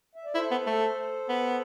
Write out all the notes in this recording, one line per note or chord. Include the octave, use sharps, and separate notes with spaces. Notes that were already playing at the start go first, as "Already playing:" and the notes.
E5
D5
E4 A4 C5
B3
A3
B3